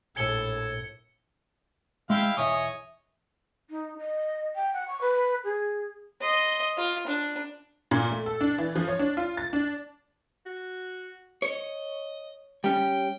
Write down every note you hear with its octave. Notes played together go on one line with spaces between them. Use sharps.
A#1 A2 A4 G#6 C#7 G7
G#3 E4 F5 G5
B1 E2 C#5 D#5 E5 G#5
D#4
D#5
G5
F#5
C#6
B4
G#4
D#5 C6
F4
D4
A#2
A3
A4
D4
E3
F3
C#5
D4
F4
A6
D4
F#4
C#5 D#5
G3 C#4 G5